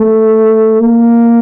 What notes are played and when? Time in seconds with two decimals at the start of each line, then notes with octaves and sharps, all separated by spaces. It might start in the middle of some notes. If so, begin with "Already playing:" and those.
Already playing: A3
0.81 A#3